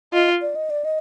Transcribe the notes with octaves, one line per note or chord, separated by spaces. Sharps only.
F4 D#5
D5
D#5
D5
D#5